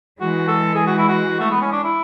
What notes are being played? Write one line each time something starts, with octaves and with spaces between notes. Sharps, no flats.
E3 G#3 F#4
A4
G#4
F#4
E4
F#4
A3
B3
C#4
D4
E4